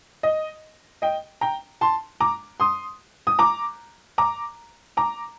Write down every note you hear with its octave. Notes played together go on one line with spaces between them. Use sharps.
D#5
D#5 G5
G5 A#5
A5 C6
A#5 D6
C6 D#6
D#6
A#5 D6
A#5 D6
A#5 D6